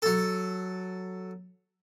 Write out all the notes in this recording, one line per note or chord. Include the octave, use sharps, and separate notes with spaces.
F#3 A4